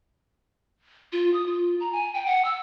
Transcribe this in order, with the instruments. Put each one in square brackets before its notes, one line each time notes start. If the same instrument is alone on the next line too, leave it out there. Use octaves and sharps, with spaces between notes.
[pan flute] F4
D#6
F4
A#5
G#5
G5
F#5
E6